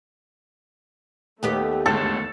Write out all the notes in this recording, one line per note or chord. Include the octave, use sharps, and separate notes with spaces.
D#2 A3 B3 G4
G1 D2 G#2 A4